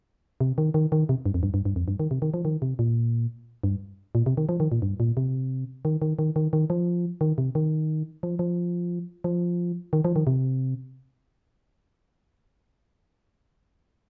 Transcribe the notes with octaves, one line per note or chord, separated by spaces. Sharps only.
C3
D#3
D#3
D#3
C3
G2
F2
G2
G2
G2
F2
G2
D#3
C3
D#3
F3
D#3
C3
A#2
G2
A#2
C3
D#3
F3
D#3
A#2
G2
A#2
C3
D#3
D#3
D#3
D#3
D#3
F3
D#3
C3
D#3
F3
F3
F3
D#3
F3
D#3
C3